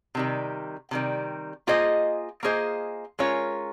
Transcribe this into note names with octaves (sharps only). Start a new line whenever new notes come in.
C3 D#3 G3
C3 D#3 G3
A#3 F4 G#4 C5 D#5
A#3 F4 G#4 C5 D#5
G#3 C#4 F4 A#4 C#5